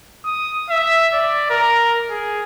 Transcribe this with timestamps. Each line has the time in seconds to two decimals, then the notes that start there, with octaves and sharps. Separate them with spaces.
0.25 D#6
0.69 E5
1.13 D5
1.50 A#4
2.10 G#4